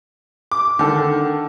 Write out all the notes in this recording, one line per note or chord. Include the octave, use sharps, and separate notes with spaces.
D6
D3 D#3 A4